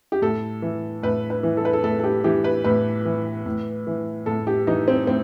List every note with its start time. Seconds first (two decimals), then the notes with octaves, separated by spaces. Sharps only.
0.12 G4
0.22 A2 A4
0.62 E3
1.03 A2 B4
1.30 B4
1.43 E3
1.57 A4
1.65 B4
1.73 A4
1.83 A2 A4
1.99 A4
2.04 G4
2.24 E3 G4
2.44 B4
2.64 A2 B4
3.05 E3
3.46 A2
3.87 E3
4.26 A2 A4
4.47 G4
4.67 E3 D#4
4.88 C4
5.07 A2 C4